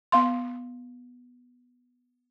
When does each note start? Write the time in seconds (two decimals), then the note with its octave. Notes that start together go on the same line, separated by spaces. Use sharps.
0.12 B3 F5 C6